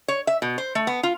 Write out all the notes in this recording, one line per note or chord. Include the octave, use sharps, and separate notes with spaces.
C#5
E5
B2
C5
A3
B3
F4